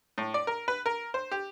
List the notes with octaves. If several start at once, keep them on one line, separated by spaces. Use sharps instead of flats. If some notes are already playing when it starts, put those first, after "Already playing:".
A2
D5
A#4
B4
A#4
C5
G4